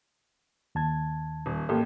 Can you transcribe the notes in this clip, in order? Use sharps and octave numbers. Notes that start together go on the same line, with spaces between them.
D#2 A5 G#6
D#1
A1 A#3 G4 A4